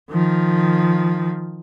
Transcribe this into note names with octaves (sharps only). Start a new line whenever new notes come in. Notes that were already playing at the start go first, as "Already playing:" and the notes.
D#3 F3